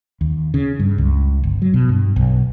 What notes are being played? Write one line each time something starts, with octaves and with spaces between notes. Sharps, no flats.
D#2
C#3
G2
C#2
G1
F#3
B2
G2
B1